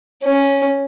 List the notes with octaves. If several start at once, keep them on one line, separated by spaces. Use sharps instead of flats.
C#4